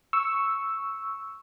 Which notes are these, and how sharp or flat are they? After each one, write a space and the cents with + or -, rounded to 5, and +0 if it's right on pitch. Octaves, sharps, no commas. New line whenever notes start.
C#6 +0 E6 +0